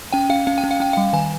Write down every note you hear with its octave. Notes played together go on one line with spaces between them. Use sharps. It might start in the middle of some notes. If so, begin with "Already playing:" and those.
C#4 G5
C#4 F5
C#4 F5
G5
C#4
F5
C#4 G5
G3 F5
D#3 G#5